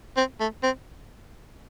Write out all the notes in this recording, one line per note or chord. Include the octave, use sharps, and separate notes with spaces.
C4
A3
C4